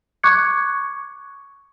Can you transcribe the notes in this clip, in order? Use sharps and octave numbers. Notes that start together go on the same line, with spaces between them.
C#6 D6 F#6 G#6 C#7